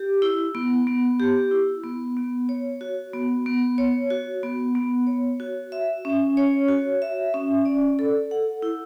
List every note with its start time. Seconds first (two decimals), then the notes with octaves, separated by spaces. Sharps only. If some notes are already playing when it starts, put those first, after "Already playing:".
Already playing: G4
0.22 E4
0.55 B3
0.87 B3
1.20 G4
1.51 E4
1.84 B3
2.17 B3
2.49 C#5
2.81 F#4
3.14 B3
3.46 B3
3.78 C#5
4.10 F#4
4.43 B3
4.75 B3
5.07 C#5
5.40 F#4
5.72 E5
6.05 C#4
6.37 C#5
6.68 F#4
7.02 E5
7.34 C#4
7.65 D5
7.99 A4
8.31 F#5
8.62 E4